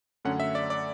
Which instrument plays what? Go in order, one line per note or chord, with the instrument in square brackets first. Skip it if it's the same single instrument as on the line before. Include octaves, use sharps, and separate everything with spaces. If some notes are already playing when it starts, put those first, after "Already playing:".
[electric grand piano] F#2 D3 A3 C#4 F#5
E5
D5
D5